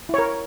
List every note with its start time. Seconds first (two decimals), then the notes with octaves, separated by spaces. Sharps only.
0.09 E4
0.14 C#5
0.18 A#4